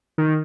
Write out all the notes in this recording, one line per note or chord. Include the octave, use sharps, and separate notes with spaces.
D#3